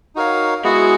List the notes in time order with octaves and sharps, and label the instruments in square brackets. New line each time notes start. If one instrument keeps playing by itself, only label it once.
[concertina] D#4 F#4 A#4 C#5 F5
[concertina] G#3 B3 E4 G#4 [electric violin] F#4